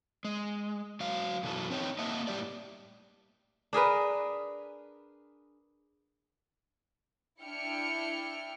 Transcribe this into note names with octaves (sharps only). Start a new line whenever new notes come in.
G#3
F#3 F5
F#2 B2 E3 F#3 A4
C4 D#4 C#5 G5
A#3 D#5 E5 F#5 A5
A2 G3 G4 D5
D4 G#4 A#4 B4
D4 E4 E5 G5 F6 C#7